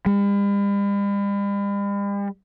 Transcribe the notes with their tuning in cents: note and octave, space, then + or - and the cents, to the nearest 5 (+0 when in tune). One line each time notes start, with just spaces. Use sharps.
G3 +45